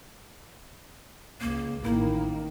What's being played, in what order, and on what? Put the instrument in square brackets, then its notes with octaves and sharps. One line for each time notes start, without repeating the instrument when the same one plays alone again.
[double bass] C#2 [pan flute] A#3
[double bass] A1 D#3 [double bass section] A#3 [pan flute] E4